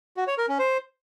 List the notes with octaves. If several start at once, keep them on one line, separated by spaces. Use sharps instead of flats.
F#4
C#5
A#4
C#4
C5